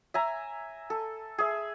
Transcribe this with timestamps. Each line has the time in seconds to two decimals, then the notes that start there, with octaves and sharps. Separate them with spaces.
0.14 E5 G#5 A#5
0.90 A4
1.38 G#4 E5